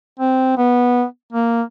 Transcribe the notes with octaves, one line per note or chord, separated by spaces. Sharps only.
C4
B3
A#3